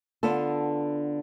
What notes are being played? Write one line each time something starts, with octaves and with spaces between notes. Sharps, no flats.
D3 B3 F4 A4